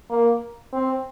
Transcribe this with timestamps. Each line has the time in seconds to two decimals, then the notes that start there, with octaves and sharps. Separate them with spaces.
0.10 A#3
0.73 C4